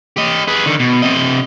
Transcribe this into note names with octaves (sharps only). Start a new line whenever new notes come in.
G4 D#5
G#4 B4
D3 D#3
B2
C3 D#5